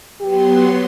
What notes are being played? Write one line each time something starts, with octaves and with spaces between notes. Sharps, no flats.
F#3 B3 G4 C6